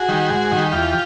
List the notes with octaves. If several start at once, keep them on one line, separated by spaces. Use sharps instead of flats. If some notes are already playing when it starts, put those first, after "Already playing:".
Already playing: F#4 G#4
D#3 G3
G#2
D#3 G3
E2 F4 G4